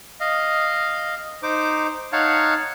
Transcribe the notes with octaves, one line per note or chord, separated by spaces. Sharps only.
D#5 F5
D#4 C5 D6
D#4 C#5 F5 F#5 A5